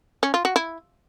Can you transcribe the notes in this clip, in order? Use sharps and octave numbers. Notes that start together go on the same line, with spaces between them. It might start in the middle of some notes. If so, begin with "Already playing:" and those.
C#4
F4
F#4
E4